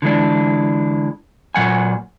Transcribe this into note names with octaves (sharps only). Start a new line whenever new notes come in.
D3 E3 G#3 D4
A#2 F#3 F#5 G#5